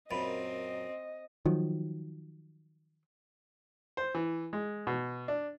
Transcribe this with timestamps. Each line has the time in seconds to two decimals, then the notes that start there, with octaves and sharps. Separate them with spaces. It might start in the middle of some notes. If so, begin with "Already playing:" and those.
0.11 F#2 A#2 C4 D#5 B5
1.46 D#3 F3 F#3
3.97 C5
4.15 E3
4.53 G#3
4.87 B2
5.28 D4